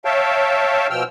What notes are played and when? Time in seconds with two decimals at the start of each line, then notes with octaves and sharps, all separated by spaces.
0.05 C#5 E5 F5 G5 A5
0.90 B2 F3 G5 E6 F6